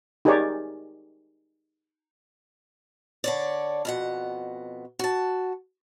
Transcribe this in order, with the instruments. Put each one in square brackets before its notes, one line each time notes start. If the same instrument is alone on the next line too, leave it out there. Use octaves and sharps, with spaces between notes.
[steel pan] D#4 G4 G#4 A#4 C#5 D5
[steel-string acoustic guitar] D3 C#5 D5
F2 B2 F#5
F#4 A5